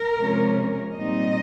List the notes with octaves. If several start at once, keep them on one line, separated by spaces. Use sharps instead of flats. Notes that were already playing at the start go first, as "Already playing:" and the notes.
Already playing: A#4
C3 F3 G#3 C#4
A#2 G3 C4 D#4 D#5